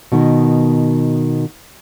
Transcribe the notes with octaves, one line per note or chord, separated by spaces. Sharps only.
B2 D#3